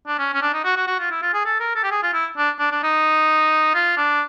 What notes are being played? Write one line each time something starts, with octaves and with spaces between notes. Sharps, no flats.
D4
C#4
C#4
D4
D#4
F#4
F#4
F#4
F4
E4
F4
G#4
A4
A#4
A4
G4
G#4
F4
E4
D4
D4
D4
D#4
F4
D4